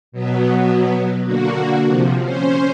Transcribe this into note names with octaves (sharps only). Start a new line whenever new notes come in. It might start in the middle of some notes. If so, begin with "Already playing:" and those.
B2 F#3 B3
D3 A#3 F#4
C3 F3
C#4 C5